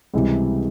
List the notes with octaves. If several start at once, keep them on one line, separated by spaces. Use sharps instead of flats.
C#2 C3 E3 G3